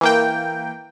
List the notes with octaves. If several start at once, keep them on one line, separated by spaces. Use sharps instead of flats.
E3 A#3 G5